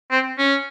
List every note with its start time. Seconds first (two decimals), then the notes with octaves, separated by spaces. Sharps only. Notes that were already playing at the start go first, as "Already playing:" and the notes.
0.11 C4
0.38 C#4